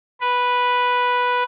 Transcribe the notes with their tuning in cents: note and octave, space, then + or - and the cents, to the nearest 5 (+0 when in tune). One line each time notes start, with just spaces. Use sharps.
B4 -5